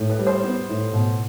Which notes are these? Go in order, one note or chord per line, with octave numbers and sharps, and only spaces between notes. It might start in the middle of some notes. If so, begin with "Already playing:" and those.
Already playing: A2
B4
G3
C5
B3
A2
B2